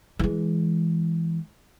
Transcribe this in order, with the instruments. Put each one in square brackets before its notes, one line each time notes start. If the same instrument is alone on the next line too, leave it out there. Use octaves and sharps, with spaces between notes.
[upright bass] E3 G#3